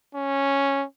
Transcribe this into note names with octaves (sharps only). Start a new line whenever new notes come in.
C#4